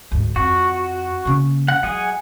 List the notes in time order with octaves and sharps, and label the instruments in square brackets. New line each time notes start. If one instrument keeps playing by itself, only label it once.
[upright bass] D2 G#2
[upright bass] F2 [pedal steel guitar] F#4
[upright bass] C#3 A#3
[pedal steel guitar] F#5
[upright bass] F#3 [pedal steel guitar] G#4 D#5 F#5